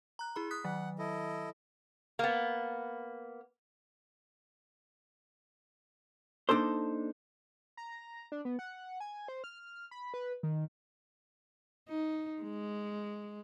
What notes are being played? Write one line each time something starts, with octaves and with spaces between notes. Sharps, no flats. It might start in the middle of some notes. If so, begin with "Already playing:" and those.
A#5 F#6
E4 G#4 B5
D#6 F#6 B6
D#3 F#3 F#5
E4 A4 D#5
A#3 B3
A#3 D4 D#4 A4 C5
A#5
D4
B3
F#5
G#5
C5
F6
B5
B4
D#3
D#4
G#3